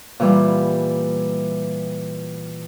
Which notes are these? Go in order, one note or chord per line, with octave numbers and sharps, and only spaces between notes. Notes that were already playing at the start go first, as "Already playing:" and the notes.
A#2 E3 G3